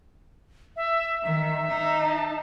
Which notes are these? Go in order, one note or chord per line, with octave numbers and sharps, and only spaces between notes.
E5
D#3 E5
D#4
A5